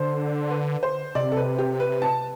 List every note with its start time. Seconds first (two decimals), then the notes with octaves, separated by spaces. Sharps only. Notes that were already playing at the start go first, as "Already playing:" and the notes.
Already playing: D3 C5
0.50 B4
0.83 C5
1.15 C3 D5
1.32 A4
1.37 B4
1.58 G4
1.80 B4
2.02 A5